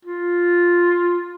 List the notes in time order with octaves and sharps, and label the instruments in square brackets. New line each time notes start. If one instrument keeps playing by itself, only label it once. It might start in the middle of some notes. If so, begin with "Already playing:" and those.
[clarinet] F4